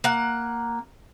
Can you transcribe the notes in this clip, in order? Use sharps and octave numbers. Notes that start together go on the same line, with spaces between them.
A#3 F#5